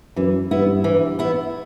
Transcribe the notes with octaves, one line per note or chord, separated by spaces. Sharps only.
F#2 E3
G2 B3 E4
E3
B3 E4